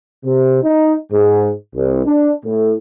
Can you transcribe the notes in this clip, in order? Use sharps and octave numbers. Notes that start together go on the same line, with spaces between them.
C3
D#4
G#2
C2
D4
A2